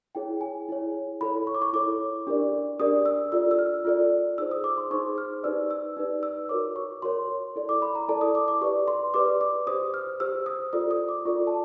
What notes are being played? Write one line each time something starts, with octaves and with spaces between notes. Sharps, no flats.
E4 G#4 C#5 G5
G#5
E4 G#4 C#5
E4 A4 C#5 B5
C#6
D6
C#6
E4 A4 C#5 D6
D4 G4 A#4 D5
D4 G4 A#4 D5 D#6
E6
F4 A4 D5 E6
E6
F6
F4 A4 D5
D#4 G#4 C5 E6
D#6
D6
C6
D#4 G#4 C5 C#6
F6
D#4 G4 B4 D5 E6
E6
D#4 G4 B4 D5
E6
F#4 A#4 C#5 D6
C#6
F#4 A#4 C#5 C6
E4 A4 D5
D6
B5
A#5
E4 A4 D5 A5
D#6
D6
D6
G4 B4 D5 C#6
C6
G4 B4 D5 D6
D6
G4 C5 D#6
F6
G4 C5 E6
D#6
F4 A4 D5 D#6
D#6
D6
F4 A4 D5 C#6
A5